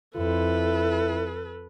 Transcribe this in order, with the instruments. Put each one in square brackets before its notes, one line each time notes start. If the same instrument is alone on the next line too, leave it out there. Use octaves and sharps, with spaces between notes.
[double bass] F2 [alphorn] E4 [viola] A4 B4